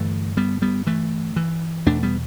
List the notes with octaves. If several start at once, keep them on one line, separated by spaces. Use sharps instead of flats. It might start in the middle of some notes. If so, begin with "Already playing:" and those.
Already playing: G2 D3 E3 A3
G3 B3
G3 B3
E3 A3
E3
E2 B2 A3 D4
G3 B3